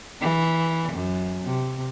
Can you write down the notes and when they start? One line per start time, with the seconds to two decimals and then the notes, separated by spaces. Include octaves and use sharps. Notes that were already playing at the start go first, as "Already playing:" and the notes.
0.21 E3
0.93 F#2
1.44 C3